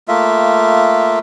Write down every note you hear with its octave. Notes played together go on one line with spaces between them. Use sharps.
A3 A#3 F4 E5